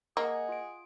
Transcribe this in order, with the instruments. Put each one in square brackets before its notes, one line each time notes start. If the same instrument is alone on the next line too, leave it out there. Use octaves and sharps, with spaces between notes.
[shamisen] A#3 [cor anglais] G#4 [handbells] D#5 F#5
[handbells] F4 D7